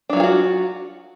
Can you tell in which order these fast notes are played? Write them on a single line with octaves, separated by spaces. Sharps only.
D4 F#3 F4 G#4 F#4